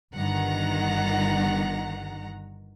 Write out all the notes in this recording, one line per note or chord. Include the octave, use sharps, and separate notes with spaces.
G1 G2 D#3 F#5 A#5